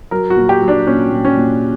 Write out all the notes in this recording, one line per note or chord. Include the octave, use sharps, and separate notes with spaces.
F#3 A#4
F#4
A#2
G4
F#3
D4
A#2 C#4
A#2
C#4
A#2